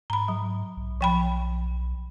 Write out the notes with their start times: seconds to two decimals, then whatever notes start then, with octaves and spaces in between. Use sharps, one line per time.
0.10 G#2 A#5 B5
0.28 F#3
0.77 B1
1.01 F3 G5 B5